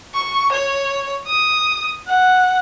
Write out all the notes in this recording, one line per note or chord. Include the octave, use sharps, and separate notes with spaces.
C#6
C#5
D#6
F#5